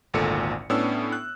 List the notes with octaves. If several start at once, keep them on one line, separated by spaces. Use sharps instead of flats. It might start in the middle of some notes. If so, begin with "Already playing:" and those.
G#1 D2 A#2 A4 C#7
A2 B3 C#4 D4 E6
F#6